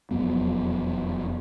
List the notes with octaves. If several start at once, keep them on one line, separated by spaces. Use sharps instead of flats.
E1 F2 F#3 B3